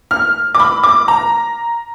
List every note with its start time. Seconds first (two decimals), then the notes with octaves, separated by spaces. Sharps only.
0.11 F6
0.55 D6
0.60 B5
0.83 D6
1.08 A#5